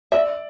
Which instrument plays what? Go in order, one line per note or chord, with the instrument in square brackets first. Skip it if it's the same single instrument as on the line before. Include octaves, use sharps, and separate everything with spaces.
[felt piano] D5 [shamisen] E5